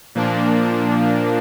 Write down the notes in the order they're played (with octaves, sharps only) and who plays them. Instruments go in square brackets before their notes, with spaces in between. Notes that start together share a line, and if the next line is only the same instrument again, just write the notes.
[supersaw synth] A#2 F3 A#3 D4